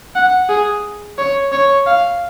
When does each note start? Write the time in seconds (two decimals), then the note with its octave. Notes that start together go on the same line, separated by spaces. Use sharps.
0.15 F#5
0.49 G#4
1.18 C#5
1.52 C#5
1.86 F5